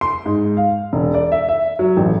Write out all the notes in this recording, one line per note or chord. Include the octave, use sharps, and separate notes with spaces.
C6
G#2
F5
E1
D5
E5
E5
F#3
A1